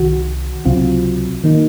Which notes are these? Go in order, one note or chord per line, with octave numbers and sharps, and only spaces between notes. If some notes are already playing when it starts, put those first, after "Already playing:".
Already playing: C2 C3 D#3 F#4
C#2 C3 F#3 C4 F4
D#3 A#3 D#4